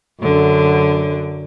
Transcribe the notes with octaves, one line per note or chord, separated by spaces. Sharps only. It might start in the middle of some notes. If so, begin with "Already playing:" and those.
F#2 D3